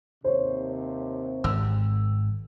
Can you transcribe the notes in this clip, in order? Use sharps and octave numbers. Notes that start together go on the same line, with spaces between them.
D#2 C3 C5 C#5
G#1 E6